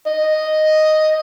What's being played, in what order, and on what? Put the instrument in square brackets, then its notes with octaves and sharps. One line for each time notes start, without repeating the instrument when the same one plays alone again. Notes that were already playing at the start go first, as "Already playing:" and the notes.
[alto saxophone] D#5